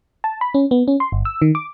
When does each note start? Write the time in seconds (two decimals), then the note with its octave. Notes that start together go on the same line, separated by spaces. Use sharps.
0.24 A5
0.41 B5
0.54 C#4
0.71 B3
0.88 C#4
1.00 C6
1.12 G1
1.25 E6
1.42 D#3
1.55 D6